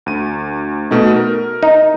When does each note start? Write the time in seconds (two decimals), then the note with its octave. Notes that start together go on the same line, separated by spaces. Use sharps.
0.06 D2 D#7
0.91 B2 A3 D#4
1.16 A#4
1.63 D#4